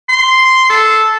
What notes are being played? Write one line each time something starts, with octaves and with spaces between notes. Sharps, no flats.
C6
A4